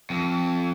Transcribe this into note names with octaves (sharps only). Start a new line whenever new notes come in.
F2